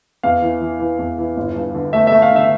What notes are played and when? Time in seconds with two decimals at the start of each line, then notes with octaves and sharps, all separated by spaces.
0.23 E2 F5
0.42 E3
0.61 E3
0.80 E3
0.99 E2
1.18 E3
1.37 G1
1.56 G2
1.75 D3
1.93 A3 E5
2.07 A3 E5
2.22 F5
2.32 D3 E5